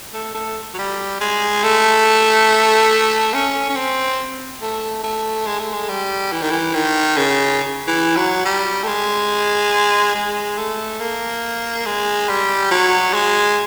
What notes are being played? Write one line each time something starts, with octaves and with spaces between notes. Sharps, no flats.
A3
A3
F#3
G3
G#3
A3
C#4
C#4
C4
A3
A3
G#3
A3
G#3
G3
E3
D#3
E3
D#3
C#3
E3
F#3
G3
A3
G#3
G#3
A3
A#3
G#3
G3
F#3
G#3